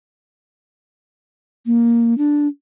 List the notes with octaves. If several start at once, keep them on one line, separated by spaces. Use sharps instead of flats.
A#3
D4